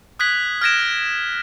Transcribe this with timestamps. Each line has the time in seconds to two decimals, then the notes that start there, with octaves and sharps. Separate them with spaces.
0.19 D#6 F#6 G#6 B6 F#7
0.62 F6 F#6 G#6 A#6 D7 E7